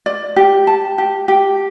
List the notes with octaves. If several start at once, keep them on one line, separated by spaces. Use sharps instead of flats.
D5
G4
A5
G4
G4